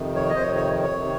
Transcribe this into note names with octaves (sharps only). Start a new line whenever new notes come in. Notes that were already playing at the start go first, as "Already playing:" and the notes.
Already playing: F2 C3 D#3
C#5
D#5
C5
F2 C3 D#3 C#5
C#5
C#5
C3 D#3